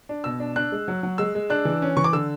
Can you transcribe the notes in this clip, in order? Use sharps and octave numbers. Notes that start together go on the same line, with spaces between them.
D4
B2 E6
D4
D4 F#6
G#3
F#3
F#3
G#3 E6
G#3
D4 F#6
E3
C#4
E3 C#6
D6
D3 E6